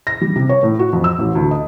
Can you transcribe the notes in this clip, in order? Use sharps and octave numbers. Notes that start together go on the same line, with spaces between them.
A#6
G3
C3
C#5
A2
F#4
F2
E6
A1
D2
D#5